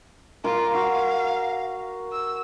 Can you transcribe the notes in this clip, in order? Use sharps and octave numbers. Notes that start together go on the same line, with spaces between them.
F4 A#4 D6
F#4 F5
E6